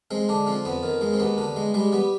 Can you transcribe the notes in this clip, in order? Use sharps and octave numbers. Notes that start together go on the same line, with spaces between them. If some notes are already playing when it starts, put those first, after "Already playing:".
G#3 C4
D3 D4
F3 C4
F2 B3
D#3
G#3
C4
D#2 B3
D3
G#3
G3 G#3
G3 B3